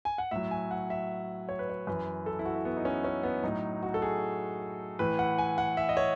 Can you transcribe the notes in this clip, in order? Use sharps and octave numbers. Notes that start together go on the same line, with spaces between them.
G#5
F#5
A2 F#3 E5
G#5
F#5
E5
C#5
B4
C#5
F#2 E3 B4
A4
E4
F#4
E4
B3
D#4
C#4
C#4
B3
A2 F#3 D#4
F#4
A4
G#4
A2 E3 B4
F#5
G#5
F#5
E5
D#5
C#5